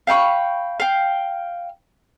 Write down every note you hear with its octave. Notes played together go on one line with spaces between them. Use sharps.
F5 G5 B5 C#6
F5 G5